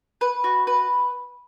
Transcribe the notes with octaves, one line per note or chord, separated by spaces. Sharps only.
B4
F#4
B4